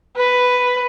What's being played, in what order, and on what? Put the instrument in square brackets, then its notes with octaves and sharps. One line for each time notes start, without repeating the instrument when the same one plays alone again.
[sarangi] B4